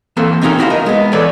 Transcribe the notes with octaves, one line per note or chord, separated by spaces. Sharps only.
E3 A#3 C4 A4 C5
A3 C4 C#4 D#4 G4 A#4
E4 F#4 C5 F5
A#4 D#5
G#3 B3
E3 A4 B4 C#5 D5